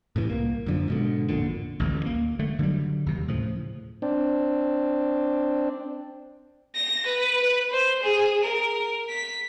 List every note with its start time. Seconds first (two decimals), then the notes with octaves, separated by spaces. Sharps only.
0.16 A2 C3 E3
0.30 C2 A#3
0.66 F#2 D3 F3
0.88 G#2 B2 D3
1.28 A1 F2 A#2 D3
1.80 A1 D2 G2
2.06 A#3
2.39 D3 A3
2.59 D3 F#3 G3
3.06 D#2 C3
3.28 A2 C#3 F3
4.02 C4 D4
6.75 A#6
7.06 B4
7.42 B4
7.72 C5
8.02 G#4
8.43 A#4
9.09 B6